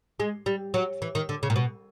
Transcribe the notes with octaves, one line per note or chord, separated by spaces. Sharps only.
G#3
G3
F#3
E3
D#3
D3
C#3
A#2
B2